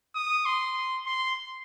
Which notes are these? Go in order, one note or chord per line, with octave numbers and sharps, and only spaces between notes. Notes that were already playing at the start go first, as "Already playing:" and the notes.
D#6
C6
C6